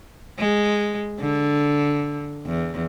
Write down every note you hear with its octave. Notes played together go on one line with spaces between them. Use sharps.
G#3
D3
E2